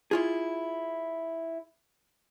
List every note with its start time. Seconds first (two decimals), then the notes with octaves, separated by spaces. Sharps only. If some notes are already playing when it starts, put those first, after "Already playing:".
0.11 E4 F4 G#4